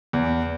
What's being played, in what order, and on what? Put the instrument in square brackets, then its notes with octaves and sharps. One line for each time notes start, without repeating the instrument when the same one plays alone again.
[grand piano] E2